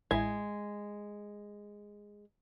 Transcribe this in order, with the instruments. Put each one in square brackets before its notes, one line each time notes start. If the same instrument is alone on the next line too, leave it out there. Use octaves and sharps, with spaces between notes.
[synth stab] A1 E4 G#6 [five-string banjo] G#3